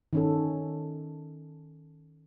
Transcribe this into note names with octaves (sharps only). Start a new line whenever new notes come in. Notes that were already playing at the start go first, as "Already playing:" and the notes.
D#3 C#4 A4